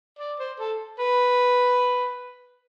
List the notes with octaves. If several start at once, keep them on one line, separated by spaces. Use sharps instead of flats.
D5
C5
A4
B4